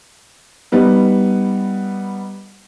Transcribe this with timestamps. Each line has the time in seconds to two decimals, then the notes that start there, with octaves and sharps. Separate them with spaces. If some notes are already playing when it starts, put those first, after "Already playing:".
0.72 G3 B3 D#4